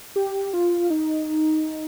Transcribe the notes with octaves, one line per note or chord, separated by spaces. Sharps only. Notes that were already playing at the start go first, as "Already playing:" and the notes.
G4
F4
D#4